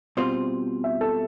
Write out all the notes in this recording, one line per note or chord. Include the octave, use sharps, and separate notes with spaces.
B2 G3 C4 F4 C5
E5
A4